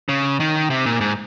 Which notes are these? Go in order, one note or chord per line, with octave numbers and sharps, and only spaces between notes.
C#3
D#3
C3
A#2
G#2